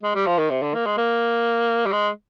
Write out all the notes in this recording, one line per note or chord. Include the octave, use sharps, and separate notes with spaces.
G#3
G3
F3
D#3
C3
D3
A#3
G#3
A#3
G3
G#3